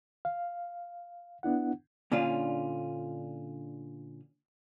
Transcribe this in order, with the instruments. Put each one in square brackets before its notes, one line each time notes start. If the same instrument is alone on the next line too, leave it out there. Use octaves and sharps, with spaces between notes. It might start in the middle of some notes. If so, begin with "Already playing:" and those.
[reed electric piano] F5
B3 D4 E4 F#5
[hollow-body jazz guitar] A#2 D3 C#4 D4 F4